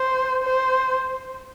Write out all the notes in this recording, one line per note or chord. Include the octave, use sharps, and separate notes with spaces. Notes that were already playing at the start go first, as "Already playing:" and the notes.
Already playing: C5
C5